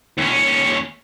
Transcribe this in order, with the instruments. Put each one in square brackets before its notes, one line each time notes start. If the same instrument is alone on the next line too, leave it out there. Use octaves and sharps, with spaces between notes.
[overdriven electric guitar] D#2 C#4